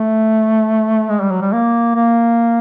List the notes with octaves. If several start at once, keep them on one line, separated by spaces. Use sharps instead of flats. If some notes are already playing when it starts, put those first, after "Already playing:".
Already playing: A3
G#3
G3
F#3
G3
A#3
A#3